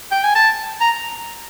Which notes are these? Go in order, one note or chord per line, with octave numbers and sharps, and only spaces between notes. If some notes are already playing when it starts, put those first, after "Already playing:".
G5
G#5
A5
A#5